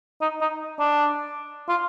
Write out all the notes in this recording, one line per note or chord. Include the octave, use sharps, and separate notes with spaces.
D#4
D#4
D4
F4